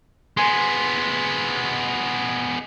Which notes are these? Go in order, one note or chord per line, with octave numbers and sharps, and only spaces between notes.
G#3 B3 G#5 C6